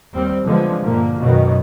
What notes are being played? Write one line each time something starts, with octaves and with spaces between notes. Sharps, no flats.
D#2 G3 C4
D3 F3 G#3 B3
G2 A#2 D3 A#3
F#2 B2 D#3